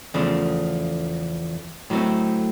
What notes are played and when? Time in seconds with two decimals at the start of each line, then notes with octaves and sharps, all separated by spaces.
0.14 E2 C#3 F3 A3
1.90 A2 F#3 A3 C4